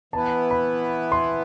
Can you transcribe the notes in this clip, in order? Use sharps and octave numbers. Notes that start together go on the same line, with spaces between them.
E3 B3 E4 B4 A5
B5
C6